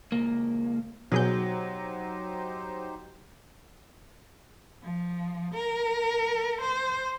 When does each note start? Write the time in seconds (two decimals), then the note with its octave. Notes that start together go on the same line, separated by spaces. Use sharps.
0.12 C#2 A#3
1.12 B2 F#3 D#4 G4 G#4 C5 G6
4.83 F3
5.54 A#4
6.61 C5